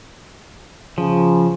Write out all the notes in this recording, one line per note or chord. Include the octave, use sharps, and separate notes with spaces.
C#3 F3